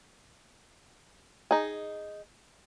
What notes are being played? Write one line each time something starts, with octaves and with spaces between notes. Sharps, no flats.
D#4 G#4